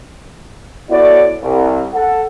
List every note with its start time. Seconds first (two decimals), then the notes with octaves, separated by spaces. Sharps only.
0.89 B3 E4 F#4 A4 C#5 D5
1.41 C2
1.93 A4 F#5